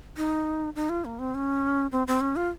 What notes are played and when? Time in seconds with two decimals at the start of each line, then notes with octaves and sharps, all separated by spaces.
0.17 D#4
0.75 D#4
0.89 F4
1.05 A#3
1.19 C4
1.34 C#4
1.92 C4
2.07 C4
2.21 C#4
2.36 F4